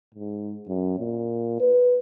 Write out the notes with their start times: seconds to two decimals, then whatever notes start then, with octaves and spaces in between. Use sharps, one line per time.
0.14 G#2
0.68 F#2
0.98 A#2
1.60 B4